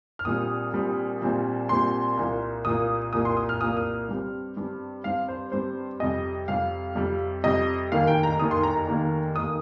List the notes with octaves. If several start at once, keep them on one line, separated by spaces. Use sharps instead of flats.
F6
A#1 A#2 G3 C4 D#6
A#1 A#2 G3 C4
A#1 A#2 G3 C4
A#1 A#2 G3 C4 C6
C2 A#2 A#3
C2 A#2 A#3 D#6
C2 A#2 A#3 D#6
C6
D#6
F6
C2 A#2 A#3 D#6
D#6
G2 G3 C4
G2 G3 C4
G2 G3 C4 F5
C5
G2 G3 C4 C5
F2 C3 G3 D#5
F2 C3 G3 F5
F2 C3 G3
F2 C3 G3 D#5
F1 D#2 D#3 A#3 F5
G5
A#5
F1 D#2 D#3 A#3 D#6
C6
A#5
A#5
F1 D#2 D#3 A#3
F1 D#3 A#3 D#6